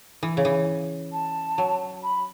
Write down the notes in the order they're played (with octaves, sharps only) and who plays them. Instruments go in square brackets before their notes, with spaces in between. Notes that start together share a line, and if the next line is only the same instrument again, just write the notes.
[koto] E3
C#3
E3
[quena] A5
[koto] F#3
[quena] B5